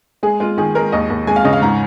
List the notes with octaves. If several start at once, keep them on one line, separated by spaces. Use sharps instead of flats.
G#3 G#4
G#3 F4
D#3 G#4
G#3 A#4
D#2 D#5
D#2
G#3 G#5
F5
C#3 D#5
F5
G#2 A#5